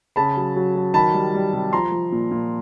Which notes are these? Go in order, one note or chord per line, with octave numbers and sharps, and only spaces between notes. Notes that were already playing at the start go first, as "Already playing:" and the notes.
C#3 A5 B5
F#3
F#3
F#3
D#3 A5 B5
G3
G3
C3
F3 A#5 C6
F3
A#2
A#2